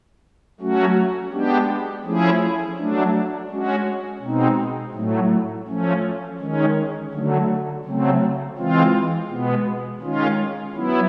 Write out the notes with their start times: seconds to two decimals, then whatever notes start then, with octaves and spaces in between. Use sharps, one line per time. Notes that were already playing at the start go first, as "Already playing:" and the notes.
0.60 F#3 A3 C#4 F#4
1.32 G#3 B3 D4 G4
2.04 F3 A3 C#4 E4 G#4
2.78 F#3 A3 D4
3.50 G#3 C#4 F#4
4.22 B2 G#3 C4 D#4
4.95 A2 F#3 A3
5.68 F3 A3 C#4
6.40 D#3 G#3 C#4
7.12 D3 F#3 A3
7.85 C#3 F#3 A3 C4
8.58 E3 G#3 C4 F4
9.29 B2 G#3 B3
10.02 D#3 G#3 C#4 F4
10.75 F#3 B3 E4